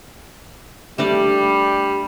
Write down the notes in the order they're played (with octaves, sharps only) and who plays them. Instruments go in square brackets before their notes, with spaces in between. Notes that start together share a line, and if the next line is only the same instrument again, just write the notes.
[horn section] G3 [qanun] A3 D4 D5